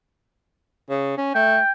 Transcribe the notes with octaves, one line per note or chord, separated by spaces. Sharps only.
C#3
C#4
A3 G5